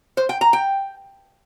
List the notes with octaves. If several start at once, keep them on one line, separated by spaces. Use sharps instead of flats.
C5
G5
A#5
G5